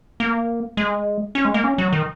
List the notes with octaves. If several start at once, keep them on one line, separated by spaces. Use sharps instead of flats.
A#3
G#3
C#4
G#3
A#3
C#4
F#3
D#3